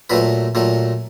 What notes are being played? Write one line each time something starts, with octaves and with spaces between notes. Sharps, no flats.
A#2 F#3 A3 B4
A#2 F#3 A3